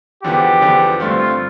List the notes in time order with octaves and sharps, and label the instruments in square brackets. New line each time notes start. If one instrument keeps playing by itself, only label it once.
[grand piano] E2 D3 F3 B3 [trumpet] G4
[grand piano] E2 D3 F3 B3
[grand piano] G2 D3 A3 C4 [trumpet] F4